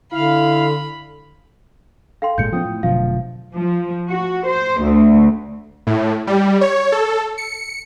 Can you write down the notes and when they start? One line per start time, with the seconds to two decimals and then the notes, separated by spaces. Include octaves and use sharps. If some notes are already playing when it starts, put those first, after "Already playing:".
0.12 D3 E4 F5 B5
2.22 A4 F5 G5 C6
2.38 G#1 A#2 G#3 G6 C#7
2.52 F3 B3 C#4 F4 G5 D#6
2.65 A2
2.83 F1 B2 D3 F3 F#3 A3 F5
3.55 F3
4.09 F#4
4.46 C5
4.81 D2
5.87 A2
6.27 G3
6.61 C#5
6.92 A4
7.38 C#7